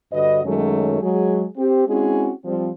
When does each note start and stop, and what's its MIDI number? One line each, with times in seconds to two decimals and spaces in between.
0.13 0.40 43
0.13 0.40 50
0.13 0.40 66
0.13 0.40 71
0.13 0.40 75
0.44 0.99 42
0.44 0.99 51
0.44 0.99 54
0.44 0.99 56
0.44 0.99 57
0.44 0.99 61
1.02 1.45 54
1.02 1.45 56
1.02 1.45 68
1.58 1.88 60
1.58 1.88 67
1.88 2.31 56
1.88 2.31 60
1.88 2.31 61
1.88 2.31 64
1.88 2.31 66
1.88 2.31 68
2.45 2.69 53
2.45 2.69 55
2.45 2.69 60